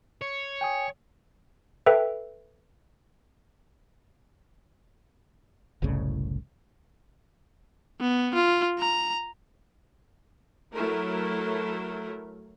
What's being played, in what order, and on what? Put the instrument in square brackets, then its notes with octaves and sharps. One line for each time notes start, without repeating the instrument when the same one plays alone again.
[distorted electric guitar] C#5
[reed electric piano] G5 G#5 D#6
[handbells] A4 B4 E5 G5
[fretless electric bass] F#1 C2 A2 C#3
[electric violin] B3
F4
A#5
[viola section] F#3 A3 E4 A#4